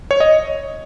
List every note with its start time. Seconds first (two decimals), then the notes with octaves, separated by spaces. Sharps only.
0.11 C#5
0.20 D#5